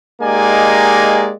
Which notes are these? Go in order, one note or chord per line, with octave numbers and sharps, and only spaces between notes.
G#3 A#3 D#4 G4 D5 G#5